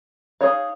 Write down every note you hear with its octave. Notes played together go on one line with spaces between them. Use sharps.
D#4 G#4 C#5 F5